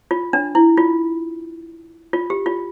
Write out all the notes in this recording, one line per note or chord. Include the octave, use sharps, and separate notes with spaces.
F4
D4
E4
F4
F4
G4
F4